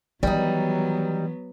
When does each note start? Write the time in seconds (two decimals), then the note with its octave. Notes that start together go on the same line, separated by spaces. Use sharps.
0.23 D#3 E3 F#3 G3 B3 D#4